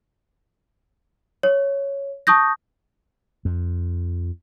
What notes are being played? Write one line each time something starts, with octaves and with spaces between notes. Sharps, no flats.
C#5
A5 C#6 D#6 G6 A#6
F2